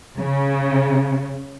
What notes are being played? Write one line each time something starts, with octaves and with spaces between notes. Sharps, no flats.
C#3